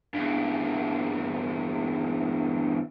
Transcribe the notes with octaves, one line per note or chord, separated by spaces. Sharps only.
E2 G2